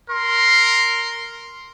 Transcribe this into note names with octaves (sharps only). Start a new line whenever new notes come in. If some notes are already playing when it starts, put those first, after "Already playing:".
A#4 C6